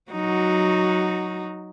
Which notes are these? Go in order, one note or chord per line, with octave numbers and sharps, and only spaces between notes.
F#3 D#4 F#4